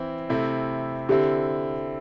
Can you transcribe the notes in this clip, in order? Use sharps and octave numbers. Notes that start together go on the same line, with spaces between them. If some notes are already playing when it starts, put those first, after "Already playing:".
Already playing: E3 C4 E4
C3 A3 C4 E4
D3 C4 E4 G4